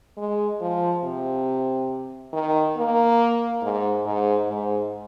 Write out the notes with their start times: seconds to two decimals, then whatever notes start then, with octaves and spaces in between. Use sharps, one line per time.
0.17 G#3
0.61 F3
1.04 C3
2.33 D#3
2.77 A#3
3.62 G#2
4.05 G#2
4.48 G#2